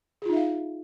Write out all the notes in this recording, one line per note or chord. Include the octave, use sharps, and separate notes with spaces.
D#4 F4 G#4 E5 F5